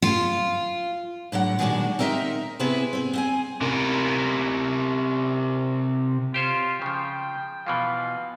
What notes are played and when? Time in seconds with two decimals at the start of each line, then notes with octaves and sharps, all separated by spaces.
0.02 F4
1.32 A2 D3 F#3 F#5
1.59 A#2 D#3 G#3 B3 D4 F#4
1.99 C4 D#4 A#4 D#5 E5
2.60 C3 B3 C4 E4 G#4 B4
2.93 C4 G#4
3.13 C4 F5 G#5
3.61 C3 A#4
6.34 F4 G4 C5 C#5
6.82 C#3 F3 G5
7.67 B2 E3 F3 F5